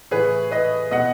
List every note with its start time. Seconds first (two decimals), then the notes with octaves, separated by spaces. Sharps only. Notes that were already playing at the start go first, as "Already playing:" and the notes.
0.11 A2 E3 G#4 B4
0.51 B4 D#5
0.91 B2 D#5 F#5